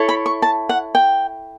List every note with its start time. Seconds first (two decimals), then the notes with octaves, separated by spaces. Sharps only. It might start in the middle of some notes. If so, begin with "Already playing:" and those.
Already playing: E4 A4 C#5
0.09 B5
0.26 C#6
0.42 A5
0.69 F#5
0.95 G5